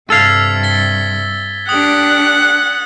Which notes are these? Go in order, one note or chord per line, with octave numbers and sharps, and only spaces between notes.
G2 C3 A4 F5 E6 G#6 B6
A6 B6 G7
D4 G4 F#5 D#6 F#7